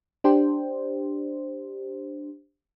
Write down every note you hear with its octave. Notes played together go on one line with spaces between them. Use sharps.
D4 G4 C5